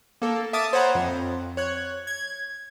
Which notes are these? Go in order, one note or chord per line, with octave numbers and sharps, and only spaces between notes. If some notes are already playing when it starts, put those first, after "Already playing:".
A#3 A4
E5 A5 D6 D#6 F6 A6
C5 C#5 F#5 A#5 B5
F2
C#5 F#6 G#6
G#6